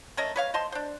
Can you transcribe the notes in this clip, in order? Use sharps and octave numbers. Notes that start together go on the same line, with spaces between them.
A3 C#4 A#4 D#5
B4 C#5 F5
C5 D#5 A5 C6
D4 C5